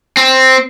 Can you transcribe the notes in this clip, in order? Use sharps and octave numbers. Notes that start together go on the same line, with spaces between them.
C4